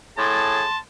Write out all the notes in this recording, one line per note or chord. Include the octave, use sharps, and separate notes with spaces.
A2 G#4 A5 C6